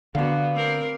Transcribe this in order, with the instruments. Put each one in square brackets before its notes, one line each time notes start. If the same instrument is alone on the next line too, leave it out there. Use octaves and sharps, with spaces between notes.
[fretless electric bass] D3 [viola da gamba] B3 F#4 [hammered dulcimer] D5 F5
[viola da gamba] C4 A#4